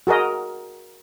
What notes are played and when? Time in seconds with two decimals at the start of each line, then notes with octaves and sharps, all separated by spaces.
0.07 F#4 G#4 A#4 D#5